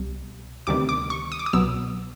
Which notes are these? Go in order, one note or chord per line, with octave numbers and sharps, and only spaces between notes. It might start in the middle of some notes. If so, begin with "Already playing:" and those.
Already playing: C2 B2 G3
D2 C3 D#3 G3 B3 D6
D6
C#6
D#6
D6
D#6
C2 B2 F#3 B3 E6